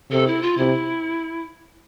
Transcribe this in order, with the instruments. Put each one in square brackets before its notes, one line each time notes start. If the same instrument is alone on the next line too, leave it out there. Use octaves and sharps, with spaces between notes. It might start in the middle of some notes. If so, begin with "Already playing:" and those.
[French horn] C3 [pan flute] A4
[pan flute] E4
F4
[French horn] C3 [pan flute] E4